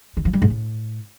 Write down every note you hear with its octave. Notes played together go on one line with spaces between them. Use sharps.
D#3
F3
G3
G#2
A2